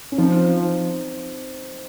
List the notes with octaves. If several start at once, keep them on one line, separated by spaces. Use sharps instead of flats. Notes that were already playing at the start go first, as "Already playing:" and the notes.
C#4
F3 C4 D#4